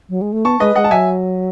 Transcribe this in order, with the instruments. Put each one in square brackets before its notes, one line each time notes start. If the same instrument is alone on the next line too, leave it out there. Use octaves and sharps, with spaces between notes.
[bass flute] F#3
G#3
A3
[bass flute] B3 [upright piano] A5 C#6
[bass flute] G#3 [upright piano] B4 D#5
[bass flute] G#3 [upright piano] D#5 F#5
[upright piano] A5
[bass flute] F#3 [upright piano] E5 G#5